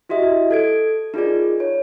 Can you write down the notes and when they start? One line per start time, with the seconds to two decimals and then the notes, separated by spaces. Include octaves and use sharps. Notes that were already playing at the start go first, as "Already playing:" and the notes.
0.09 E4 F#4 G4 D#5 E5
0.51 A4 G#6 D7
1.14 D#4 F4 G#4 A#4 D5
1.60 C#5